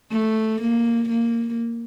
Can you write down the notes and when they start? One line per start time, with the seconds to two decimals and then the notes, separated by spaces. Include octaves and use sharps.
0.11 A3
0.61 A#3
1.09 A#3